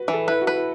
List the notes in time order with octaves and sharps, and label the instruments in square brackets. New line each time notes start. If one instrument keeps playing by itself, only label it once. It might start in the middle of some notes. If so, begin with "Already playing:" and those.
Already playing: [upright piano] F#4 B4
[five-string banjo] E3
[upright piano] A4
[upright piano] E4 [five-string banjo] B4
[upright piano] F#4
[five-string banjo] B4
[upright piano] E4